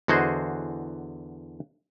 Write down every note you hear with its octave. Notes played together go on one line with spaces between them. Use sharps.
E2 D3 F#4 G#4 C5 D#5